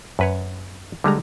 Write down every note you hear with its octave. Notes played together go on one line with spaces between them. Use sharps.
F#2 B4 C#5
D3 G3 G#3 A#5